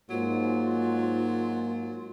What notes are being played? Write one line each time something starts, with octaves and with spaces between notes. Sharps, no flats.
G#2 F#3 A#3 F4